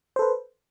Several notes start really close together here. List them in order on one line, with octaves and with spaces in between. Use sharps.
C5 A4 B4